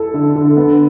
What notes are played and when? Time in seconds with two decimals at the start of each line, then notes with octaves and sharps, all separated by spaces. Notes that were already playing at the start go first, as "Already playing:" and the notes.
Already playing: E4 A4
0.14 D3
0.36 D3
0.57 B3